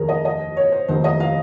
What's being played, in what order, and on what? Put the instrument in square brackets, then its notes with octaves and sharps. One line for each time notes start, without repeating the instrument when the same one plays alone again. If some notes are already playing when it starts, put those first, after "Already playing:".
Already playing: [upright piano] F1 D#2 D#3 [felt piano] G#4 A#4
[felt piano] D#5
D#5
C#5
C5
[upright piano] F1 D#2 D#3 [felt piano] C5
[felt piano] D#5
F5